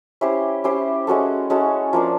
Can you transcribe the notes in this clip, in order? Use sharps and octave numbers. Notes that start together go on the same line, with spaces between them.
C#4 E4 G4 C5
C#4 E4 G4 C5
G#3 C#4 F#4 A4
G#3 C#4 F#4 A4
F3 A#3 D4